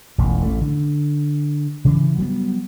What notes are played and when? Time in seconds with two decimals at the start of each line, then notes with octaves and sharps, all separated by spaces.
0.18 E1 A1 F2
0.42 A1 A3
0.62 D3
1.85 C#3 E3
2.18 F#3 G3 B3